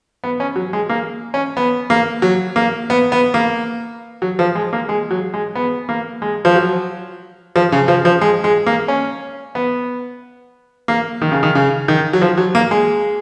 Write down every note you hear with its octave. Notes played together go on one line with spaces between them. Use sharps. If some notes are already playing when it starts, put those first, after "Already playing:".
B3
C#4
F#3
G#3
A#3
C#4
B3
A#3
F#3
A#3
B3
B3
A#3
F#3
F3
G#3
A#3
G#3
F#3
G#3
B3
A#3
G#3
F3
F#3
F3
C#3
F3
F3
G#3
G#3
A#3
C#4
B3
A#3
D#3
C#3
D#3
C#3
D#3
F#3
F3
F#3
A#3
G#3